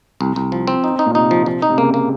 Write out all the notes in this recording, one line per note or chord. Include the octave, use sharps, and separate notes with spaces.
C2
C2
F3
C4
D#4
D#4
A#2
C3 D#4
F3
F3
D#4
C3
C#3 A#3
A#3